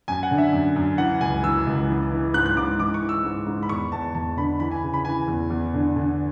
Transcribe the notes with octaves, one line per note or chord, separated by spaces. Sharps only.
F#2 G#5
F#5
D3
E5
F#2
F#2
E3 F#5
C#2 G#5
E3 E6
C#2
E3
E3
G#2 F#6
F#6
G#2 D6
E3 D6
C#6
E3
E6
G#2
G#2
B5
E2 C#6
E2 A5
E2 A5
D3 B5
E3 B5
G#5
C#3
B5
E3 G#5
E2
E2
D3
D3